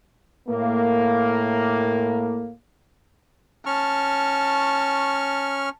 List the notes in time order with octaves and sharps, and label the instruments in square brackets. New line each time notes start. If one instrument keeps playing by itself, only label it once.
[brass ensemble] A2 A#3
[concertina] C#4 C#6 F6 [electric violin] A5